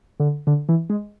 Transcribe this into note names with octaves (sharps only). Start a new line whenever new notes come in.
D3
D3
E3
G#3